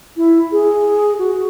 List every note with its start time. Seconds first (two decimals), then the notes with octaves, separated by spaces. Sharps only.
0.17 E4
0.52 G#4
1.19 F#4